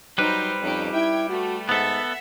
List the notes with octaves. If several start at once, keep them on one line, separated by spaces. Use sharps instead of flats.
F#3 G3 D#4 B4 C5
F2 C#4 D#4 G4
E4 G5 G#6
A3 F#4
G#2 B3 A4 E5 F#5